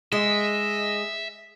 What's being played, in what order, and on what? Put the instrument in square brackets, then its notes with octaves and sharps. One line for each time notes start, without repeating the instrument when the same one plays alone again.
[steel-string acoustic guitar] G#3 [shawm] D#5 [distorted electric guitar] E5